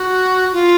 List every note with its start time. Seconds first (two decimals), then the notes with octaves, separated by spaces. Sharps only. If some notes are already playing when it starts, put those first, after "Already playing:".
Already playing: F#4
0.53 F4